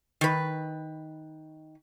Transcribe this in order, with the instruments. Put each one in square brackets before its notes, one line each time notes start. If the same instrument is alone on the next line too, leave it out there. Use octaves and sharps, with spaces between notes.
[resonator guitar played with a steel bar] D#3 B4